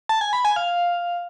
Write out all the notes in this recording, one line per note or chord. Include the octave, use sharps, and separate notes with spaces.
A5
G#5
B5
G#5
F5